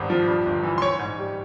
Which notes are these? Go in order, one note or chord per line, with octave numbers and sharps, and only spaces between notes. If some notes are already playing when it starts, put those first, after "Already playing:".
Already playing: G#1 G2
F3
G2
G1
E3
C6
E3 C#5 C#6
G#2
G3